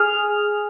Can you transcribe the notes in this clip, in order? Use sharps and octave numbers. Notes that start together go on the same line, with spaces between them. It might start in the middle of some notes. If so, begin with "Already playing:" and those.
Already playing: G#4 F6